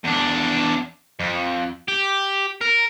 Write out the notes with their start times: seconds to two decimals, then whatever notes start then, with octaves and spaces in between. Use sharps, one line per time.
0.04 E2 D4
1.20 F2
1.88 G4
2.61 A#4